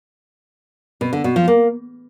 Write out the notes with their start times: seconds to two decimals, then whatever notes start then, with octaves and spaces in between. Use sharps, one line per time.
1.01 B2
1.13 D3
1.24 B2
1.36 F3
1.48 A#3